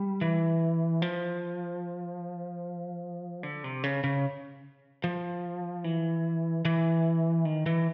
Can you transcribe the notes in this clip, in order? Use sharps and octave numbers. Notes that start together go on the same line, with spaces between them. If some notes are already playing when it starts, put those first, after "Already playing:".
Already playing: G3
E3
F3
D3
C3
C#3
C#3
F3
E3
E3
D#3
E3